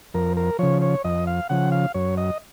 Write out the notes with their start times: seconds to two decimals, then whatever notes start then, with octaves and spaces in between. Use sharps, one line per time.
0.14 F2 A#4
0.37 A#4
0.59 C#3 F3 C#5
0.82 C#5
1.04 F2 D#5
1.27 F5
1.49 C#3 F3 F#5
1.72 F5
1.94 F#2 C#5
2.17 D#5